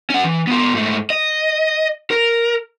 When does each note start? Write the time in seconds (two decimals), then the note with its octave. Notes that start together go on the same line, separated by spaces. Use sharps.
0.10 C#4 F#5
0.24 E3
0.47 B3 F4
0.74 G#2 A3
1.10 D#5
2.11 A#4